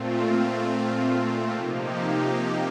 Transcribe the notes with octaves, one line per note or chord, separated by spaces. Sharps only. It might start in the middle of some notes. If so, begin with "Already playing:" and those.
Already playing: A#2 A3 C4 F4
C3 F3 A#3 D#4 G4